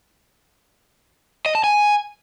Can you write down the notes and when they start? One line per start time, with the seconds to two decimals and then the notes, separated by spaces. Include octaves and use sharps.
1.46 D#5
1.55 A5
1.64 G#5